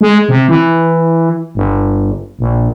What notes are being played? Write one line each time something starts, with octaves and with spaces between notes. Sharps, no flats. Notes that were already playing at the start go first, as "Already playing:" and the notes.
G#3
C3
E3
G1
A#1